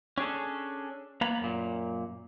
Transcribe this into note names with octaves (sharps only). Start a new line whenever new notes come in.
C#4 D4 G#4 A4
A#3 B3 A#5 B5
F#2 A#2